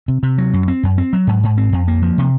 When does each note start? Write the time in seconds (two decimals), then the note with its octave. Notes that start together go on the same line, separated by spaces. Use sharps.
0.08 C3
0.23 C3
0.38 F#3
0.53 F#2
0.68 C4
0.83 F#2
0.98 C4
1.13 F#3
1.27 G#2
1.43 G#2
1.57 C4
1.73 F2
1.88 A#3
2.02 F3
2.18 C3